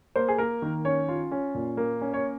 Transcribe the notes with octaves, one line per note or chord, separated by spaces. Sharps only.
A#3 C5
G#4
A#3 A#4
D#3
C#4 C#5
F4
C#4
A#2
A#3
C#4
C#5